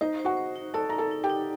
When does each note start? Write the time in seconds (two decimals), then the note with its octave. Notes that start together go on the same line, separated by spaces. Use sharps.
0.01 D#4 C5 D#5
0.19 C5
0.25 F#4 F#5
0.37 C5
0.56 D#4
0.74 A4 D5 A5
0.89 D#4 A#5
0.98 A4 A5
1.11 D#4
1.23 G4 G5
1.30 D#4